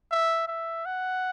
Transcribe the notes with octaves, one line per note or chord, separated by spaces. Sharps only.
E5
E5
F#5